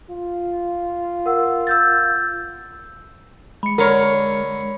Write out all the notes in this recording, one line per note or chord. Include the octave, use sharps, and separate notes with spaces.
F4
A#4 F#5 E6
E6 G6 A6
G#3 B5 C#7
D3 A#4 C#5